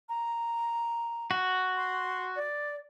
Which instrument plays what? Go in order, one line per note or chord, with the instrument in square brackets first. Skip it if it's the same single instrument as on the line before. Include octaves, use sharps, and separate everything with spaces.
[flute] A#5
[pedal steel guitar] F#4
[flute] C6
D5